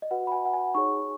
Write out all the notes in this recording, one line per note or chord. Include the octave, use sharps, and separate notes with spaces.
D#5
F#4 B4 F#5
B5
G#5
F#5
G#5
D#4 G#4 C#5 C#6